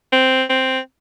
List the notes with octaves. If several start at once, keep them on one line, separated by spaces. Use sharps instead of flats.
C4
C4